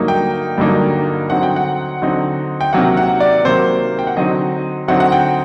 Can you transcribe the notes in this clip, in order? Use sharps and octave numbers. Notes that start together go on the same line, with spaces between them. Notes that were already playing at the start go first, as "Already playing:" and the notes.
Already playing: G2 D3 F#3 A#3 D#4
G5
G2 D3 F#3 A#3 D#4
D3 F#3 C4 D#4 F#5
G5
F#5
D3 F#3 C4 D#4
G5
C3 D#3 F#3 A#3 F#5
F#5
D5
C3 D#3 F#3 A#3 C5
G5
F#5
D3 F#3 C4 D#4 D#5
D3 F#3 C4 D#4 F#5
F#5
G5